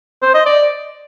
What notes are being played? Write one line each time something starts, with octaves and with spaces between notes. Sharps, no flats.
C5
D#5
D5